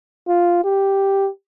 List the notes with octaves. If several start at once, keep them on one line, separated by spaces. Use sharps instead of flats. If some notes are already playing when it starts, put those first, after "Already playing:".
F4
G4